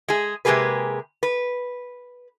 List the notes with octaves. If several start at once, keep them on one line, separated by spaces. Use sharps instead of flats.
G#3 G#4
C3 G#3 A#3 G4 G#4 B4
B4